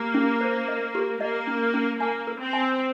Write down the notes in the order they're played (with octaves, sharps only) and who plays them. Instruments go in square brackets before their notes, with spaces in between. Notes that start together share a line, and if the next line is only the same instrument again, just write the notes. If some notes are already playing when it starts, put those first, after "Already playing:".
Already playing: [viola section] A#3 [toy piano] G4
[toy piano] C#4
C5
D#5
G4
[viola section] A#3 [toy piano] D#5
[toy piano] C#4
C#4
[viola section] A#3 [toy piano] G#5
[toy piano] A#4
[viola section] C4
[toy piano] G#5